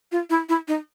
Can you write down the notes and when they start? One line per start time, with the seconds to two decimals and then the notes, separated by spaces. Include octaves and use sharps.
0.12 F4
0.30 E4
0.49 E4
0.68 D#4